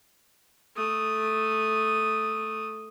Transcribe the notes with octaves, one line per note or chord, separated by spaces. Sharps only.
A3 D#6